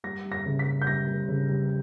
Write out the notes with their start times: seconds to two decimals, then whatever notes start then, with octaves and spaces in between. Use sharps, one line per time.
0.04 G3 A#6
0.25 G3
0.32 A#6
0.46 C#3
0.59 B6
0.66 G3
0.82 G6
0.87 G3 A#6
1.07 G3
1.28 C#3
1.49 G3